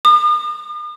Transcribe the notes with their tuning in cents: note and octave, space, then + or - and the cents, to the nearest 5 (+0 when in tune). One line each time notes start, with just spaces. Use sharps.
D#6 -45